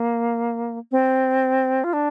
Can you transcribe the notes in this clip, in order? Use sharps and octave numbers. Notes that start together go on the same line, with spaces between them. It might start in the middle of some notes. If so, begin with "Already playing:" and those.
Already playing: A#3
C4
F4
D4